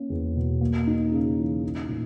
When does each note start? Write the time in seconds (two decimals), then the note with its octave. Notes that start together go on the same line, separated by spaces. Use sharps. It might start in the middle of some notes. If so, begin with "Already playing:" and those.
Already playing: A#3 C#4
0.10 E2
0.36 B2
0.61 A#3
0.87 D#4
1.12 C#3
1.38 E3
1.64 D#4
1.89 A#2